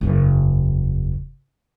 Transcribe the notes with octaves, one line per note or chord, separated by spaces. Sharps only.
F#1 E2